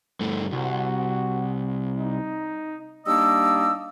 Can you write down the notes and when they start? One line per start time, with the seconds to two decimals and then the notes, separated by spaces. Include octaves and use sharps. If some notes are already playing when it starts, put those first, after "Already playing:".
0.20 G2 A3
0.52 C2 F#4
1.98 D#4
3.06 G3 A#3 D4 D#4 D#5 E6